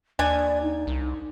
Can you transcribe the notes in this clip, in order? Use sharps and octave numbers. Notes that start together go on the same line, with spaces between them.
D#2 D4 D5 G#5
D#4
C2